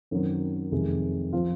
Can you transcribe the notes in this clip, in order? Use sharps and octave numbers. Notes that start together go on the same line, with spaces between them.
F#2 D#3 F#3 C4
F2 C3 D#3 G#3
F3 C4 F4